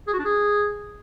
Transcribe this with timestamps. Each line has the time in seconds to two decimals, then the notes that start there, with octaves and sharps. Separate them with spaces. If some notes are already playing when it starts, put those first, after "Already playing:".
0.07 G#4
0.13 F#4
0.19 D4
0.25 G#4